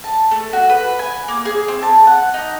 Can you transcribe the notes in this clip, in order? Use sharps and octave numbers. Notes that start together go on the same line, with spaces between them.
A5
A3
F#4
B4
G#5
A#3
G#4
C4
A5
F#5
D#4